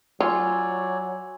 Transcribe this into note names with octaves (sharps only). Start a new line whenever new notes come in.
F#3 F4 C#5 D5 G#5 C6 E6